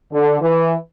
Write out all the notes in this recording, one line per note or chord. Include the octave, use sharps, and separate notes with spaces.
D3
E3